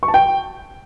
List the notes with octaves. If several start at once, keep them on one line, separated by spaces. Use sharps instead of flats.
C#6
A5
G5